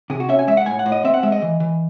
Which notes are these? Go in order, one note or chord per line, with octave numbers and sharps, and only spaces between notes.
C3 G#4
F#4
C#4 E5
G#5
G#3 E5
F#5
A2 G#5
F#5
A2
D#5
C4 E5
F#5
G#3 E5
D#5
E3
E3